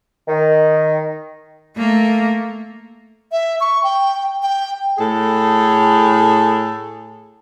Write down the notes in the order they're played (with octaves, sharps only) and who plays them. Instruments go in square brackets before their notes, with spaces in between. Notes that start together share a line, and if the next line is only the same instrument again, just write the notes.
[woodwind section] D#3
[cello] A3 A#3
[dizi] E5
C#6
G5
G5
[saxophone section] A2 G#4 A4